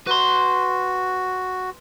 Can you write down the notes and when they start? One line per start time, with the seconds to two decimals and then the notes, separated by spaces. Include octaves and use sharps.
0.07 F#4 B4 C6